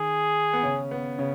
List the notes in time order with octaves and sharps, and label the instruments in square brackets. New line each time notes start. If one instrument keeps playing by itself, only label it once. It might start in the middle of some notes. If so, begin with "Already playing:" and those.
Already playing: [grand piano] D#3 [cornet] G#4
[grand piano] B3
C#3 C#4
B3
C#3 C#4